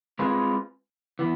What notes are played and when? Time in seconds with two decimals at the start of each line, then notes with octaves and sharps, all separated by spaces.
0.19 G#3 C4 F4 G#4 B4
1.19 E3 B3